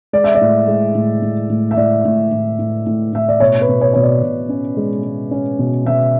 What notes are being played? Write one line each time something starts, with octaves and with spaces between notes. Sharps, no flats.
G#3 D5
E5
D5
A2
G#3
A2
A2
A2
E5
A2 D5
A2
A2
A2
A2
A2 E5
D5
B2 C#5
B4
B2
C#5
B2 C#5
D5
B2
C#4
G#3
G#3
C#4
B2
B2 E5